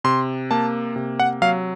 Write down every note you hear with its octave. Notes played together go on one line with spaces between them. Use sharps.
C3 C6
A#3 A5
C3
F#5
F#3 F5